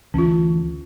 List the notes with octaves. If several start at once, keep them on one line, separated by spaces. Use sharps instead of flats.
D2 E3 C#4 F4